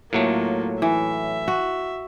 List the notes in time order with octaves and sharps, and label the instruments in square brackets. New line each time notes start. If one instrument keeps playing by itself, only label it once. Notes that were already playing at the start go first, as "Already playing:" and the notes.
[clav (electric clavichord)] A2 F#3 A3 [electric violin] A#3 F4
[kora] E3 [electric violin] E5
[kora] F#4